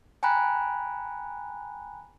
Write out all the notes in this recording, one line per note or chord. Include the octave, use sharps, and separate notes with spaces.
G5 G#5 A#5 B5 F#6